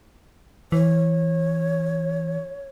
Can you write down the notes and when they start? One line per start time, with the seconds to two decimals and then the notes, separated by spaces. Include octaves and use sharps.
0.72 E3 C#5